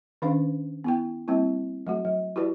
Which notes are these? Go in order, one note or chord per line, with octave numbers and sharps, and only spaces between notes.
D#3 C#4 D4 B4 F5
B3 E4 G5
G3 A#3 C4 E4
F#3 A3 F#4
F#3
E4 F#4 G4 B4 D5